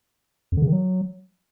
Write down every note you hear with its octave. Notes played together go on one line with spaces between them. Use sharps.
F2
D3
C#3
D#3
F#3